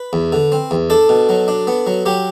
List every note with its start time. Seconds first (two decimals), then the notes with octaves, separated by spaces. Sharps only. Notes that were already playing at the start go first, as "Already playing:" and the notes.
Already playing: B4
0.13 E2
0.32 D3
0.52 C4
0.71 E2
0.90 D4 A4
1.09 B2
1.29 F#3
1.48 D4
1.67 B3
1.87 F#3
2.06 F#3 G4